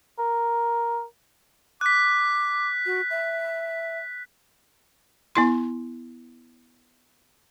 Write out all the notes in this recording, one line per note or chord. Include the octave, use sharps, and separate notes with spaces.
A#4
D6 F#6 B6
F#4
E5
B3 E4 C6